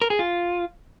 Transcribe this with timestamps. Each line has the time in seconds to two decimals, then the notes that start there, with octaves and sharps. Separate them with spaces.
0.02 A#4
0.10 G#4
0.19 F4